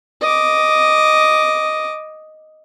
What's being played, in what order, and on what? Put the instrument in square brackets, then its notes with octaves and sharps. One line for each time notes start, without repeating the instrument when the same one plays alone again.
[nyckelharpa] D#5 D6